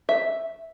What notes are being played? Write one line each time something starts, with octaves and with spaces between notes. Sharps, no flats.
E5